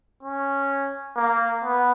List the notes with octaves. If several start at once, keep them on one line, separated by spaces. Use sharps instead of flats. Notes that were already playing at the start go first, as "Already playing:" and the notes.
C#4
A#3
B3